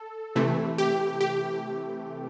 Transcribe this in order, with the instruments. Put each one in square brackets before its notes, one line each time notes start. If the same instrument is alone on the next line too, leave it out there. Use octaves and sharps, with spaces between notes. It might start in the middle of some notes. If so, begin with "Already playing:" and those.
Already playing: [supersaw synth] A4
C3 E3 A3
G4
G4